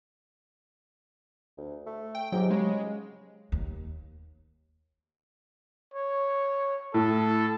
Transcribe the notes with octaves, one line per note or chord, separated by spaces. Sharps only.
D2
A3
G5
G#2 F#3 G4 G5
C#3 G#3
D#2
C#5
A2 A4